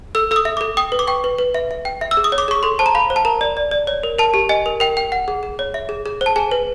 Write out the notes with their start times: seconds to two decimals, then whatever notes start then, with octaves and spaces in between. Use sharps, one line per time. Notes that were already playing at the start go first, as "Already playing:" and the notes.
0.15 A4 E6
0.31 A4 E6
0.36 D#6
0.45 E5
0.57 A4 D6
0.77 G5 D#6
0.92 B4
0.99 D6
1.07 G5 C#6
1.24 B4
1.38 B4
1.54 E5
1.71 E5
1.85 G5
2.01 E5
2.11 E6
2.17 G#4
2.24 D#6
2.32 C#5
2.38 D6
2.48 G#4 C#6
2.63 A4 C6
2.79 C5 A5
2.86 A#5
2.95 F5 B5
3.10 C5
3.16 A5
3.25 A#4 A#5
3.41 D5
3.57 D5
3.71 D5
3.87 C#5
4.03 A#4
4.18 A#4 A5
4.34 G4
4.49 D#5 G#5
4.66 A#4
4.80 A#4 G5
4.97 G5
5.12 F#5
5.28 G#4
5.43 G#4
5.59 C#5
5.74 E5
5.89 G#4
6.06 G#4
6.21 C5
6.26 A5
6.36 G#4 G#5
6.51 B4